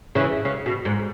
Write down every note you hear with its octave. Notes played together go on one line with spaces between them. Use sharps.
C#3 E3
C#3
B2
G#2